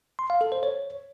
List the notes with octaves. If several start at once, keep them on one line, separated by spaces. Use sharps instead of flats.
C6
F5
A4
C5
C#5